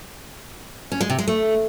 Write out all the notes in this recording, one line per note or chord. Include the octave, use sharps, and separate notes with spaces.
C#4
G#3
C3
G#3
A3